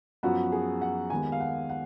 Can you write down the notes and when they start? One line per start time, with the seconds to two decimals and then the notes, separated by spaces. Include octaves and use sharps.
0.23 F#2 F3 B3 F#4
0.52 G#4
0.82 F#5
1.10 D#2 D#3 G#3 B3 G#5
1.32 F5
1.40 F#5
1.70 F#5